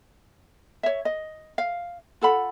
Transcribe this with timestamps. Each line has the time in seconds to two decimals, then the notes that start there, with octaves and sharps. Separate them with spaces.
0.83 C#5 E5
1.05 D#5
1.58 F5
2.21 F4 A4 F#5 B5